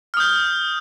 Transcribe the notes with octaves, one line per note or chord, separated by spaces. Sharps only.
D#6 F6 G6